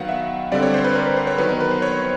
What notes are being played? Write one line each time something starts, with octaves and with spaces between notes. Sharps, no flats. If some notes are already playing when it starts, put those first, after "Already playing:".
Already playing: D#3 F#3 B3 F5 F#5
E5
D3 G3 C4 D5
C#5
C5
B4
A#4
B4
C5
C#5
D#3 F#3 B3 B4
A#4
B4
C5
C#5